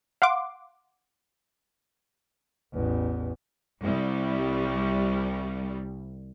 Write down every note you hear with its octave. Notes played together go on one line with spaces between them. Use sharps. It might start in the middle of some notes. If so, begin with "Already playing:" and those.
F5 F#5 C6 D6
A1 E2
C2 G3